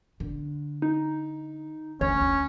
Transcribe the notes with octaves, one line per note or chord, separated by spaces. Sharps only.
D3
D#4
D2 C#4 C#5
D2